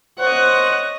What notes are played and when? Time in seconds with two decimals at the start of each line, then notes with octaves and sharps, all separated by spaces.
0.20 C5 C#5 D#5 F#5